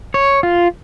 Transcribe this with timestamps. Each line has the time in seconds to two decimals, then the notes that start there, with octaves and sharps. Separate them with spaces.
0.14 C#5
0.43 F4